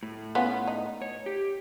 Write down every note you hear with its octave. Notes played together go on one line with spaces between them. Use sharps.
A2
B3 C#4 F4
D#4
C#5
G4